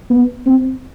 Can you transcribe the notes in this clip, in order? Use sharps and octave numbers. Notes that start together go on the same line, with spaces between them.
B3
C4